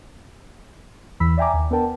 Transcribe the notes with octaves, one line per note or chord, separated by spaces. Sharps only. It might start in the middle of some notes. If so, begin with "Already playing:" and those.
E2 E3 B5 E6 B6
D5 E5 G5 G#5 A#5 D6
D#2
B3 D4 A#4 G5 A5